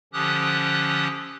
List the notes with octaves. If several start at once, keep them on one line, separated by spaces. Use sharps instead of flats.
D3 F3 C#4 G4 D#6 F#6